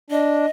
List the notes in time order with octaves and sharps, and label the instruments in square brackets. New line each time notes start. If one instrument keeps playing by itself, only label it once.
[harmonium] D4 [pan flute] D#5